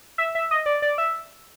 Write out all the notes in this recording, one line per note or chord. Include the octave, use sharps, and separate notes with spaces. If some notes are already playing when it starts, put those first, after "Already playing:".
E5
E5
D#5
D5
D5
E5